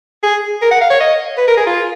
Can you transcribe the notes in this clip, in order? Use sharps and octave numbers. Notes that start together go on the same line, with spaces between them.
G#4
A#4
F#5
F5
C#5
D#5
B4
A#4
G#4
F4